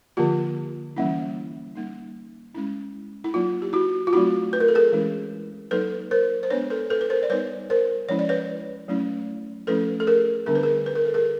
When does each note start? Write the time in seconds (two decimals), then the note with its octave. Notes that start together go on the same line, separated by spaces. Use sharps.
0.17 D3 F3 A#3 F4 G4
0.96 E3 G3 A#3 C#4 E4
1.75 G3 A#3 D#4
2.55 G#3 C#4 E4
3.24 E4
3.34 F#3 A#3 D#4 F4
3.62 G4
3.73 E4 F#4
4.07 F4
4.13 F#3 A3 C4 D#4 E4 F#4
4.53 B4
4.60 A#4
4.68 A4
4.75 G#4 A#4
4.93 E3 G#3 C#4 E4
5.71 F#3 A#3 D#4 A4 B4
6.11 A#4 C5
6.43 C5
6.50 G#3 B3 D4 B4 C#5
6.70 A4 B4
6.90 A4 B4
7.01 B4
7.10 A#4 C5
7.23 D5
7.30 G3 B3 D#4 B4 C#5
7.70 A#4 C5
8.09 F3 G#3 C#4 E4 C#5
8.19 D5
8.29 B4 C#5
8.88 F#3 A3 C#4 E4
9.67 F3 A3 C#4 E4 A4 B4
10.00 A4
10.07 G#4 A#4
10.46 D3 G3 B3 D4 A#4
10.55 B4
10.63 G#4 A#4
10.86 B4
10.95 A#4
11.05 A4
11.14 G#4 A#4